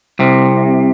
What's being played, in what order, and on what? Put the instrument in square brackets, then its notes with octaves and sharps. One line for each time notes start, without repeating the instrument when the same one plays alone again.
[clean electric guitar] C2 C3